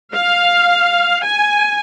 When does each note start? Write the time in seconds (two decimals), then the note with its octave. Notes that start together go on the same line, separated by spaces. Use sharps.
0.14 F5
1.24 G#5